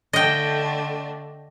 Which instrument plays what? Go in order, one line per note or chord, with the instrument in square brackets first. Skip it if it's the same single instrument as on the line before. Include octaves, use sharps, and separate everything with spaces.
[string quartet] D3 A3 D4 [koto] D#5 G5